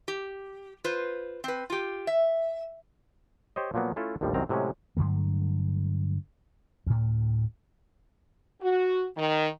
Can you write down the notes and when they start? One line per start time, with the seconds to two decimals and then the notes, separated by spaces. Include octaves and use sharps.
0.08 G4
0.84 F4 B4 C5
1.44 C4 B4
1.70 F4 G4
2.07 E5
3.56 G4 C5 C#5 D#5
3.74 A#2 F3 F#3 A#3 B3
3.96 A3 C#4 E4 F4 A4
4.21 A#1 D#2 A2 F3 G3
4.34 C2 F#2 D#3 C4 A#5
4.49 A2 C3 F#3 G#3 C#4
4.97 G2 D3 F#3 A3
6.86 D2 A2
8.62 F#4
9.17 D#3